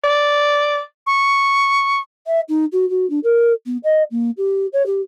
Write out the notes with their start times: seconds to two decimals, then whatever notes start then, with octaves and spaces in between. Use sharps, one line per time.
0.03 D5
1.07 C#6
2.27 E5
2.49 D#4
2.72 F#4
2.89 F#4
3.10 D4
3.24 A#4
3.66 B3
3.84 D#5
4.11 A#3
4.38 G4
4.73 C#5
4.86 G4